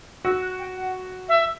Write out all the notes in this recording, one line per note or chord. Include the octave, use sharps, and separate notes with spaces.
F#4 E6
F#6
G5
F#5
E5